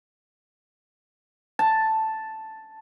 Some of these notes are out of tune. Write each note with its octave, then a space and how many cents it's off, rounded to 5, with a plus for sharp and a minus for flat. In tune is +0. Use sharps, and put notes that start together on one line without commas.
A5 +0